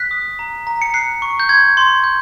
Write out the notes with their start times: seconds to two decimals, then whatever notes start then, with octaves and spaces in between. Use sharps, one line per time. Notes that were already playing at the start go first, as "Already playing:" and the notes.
Already playing: F#6 B6
0.11 D#6
0.39 A#5
0.67 A#5
0.82 C#7
0.94 F#6 C7
1.22 C#6
1.40 G6
1.49 C6 G#6
1.77 C6
2.04 G6